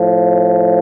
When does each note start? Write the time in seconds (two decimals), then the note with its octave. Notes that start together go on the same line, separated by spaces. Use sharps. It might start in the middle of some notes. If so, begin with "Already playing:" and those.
Already playing: A2 F3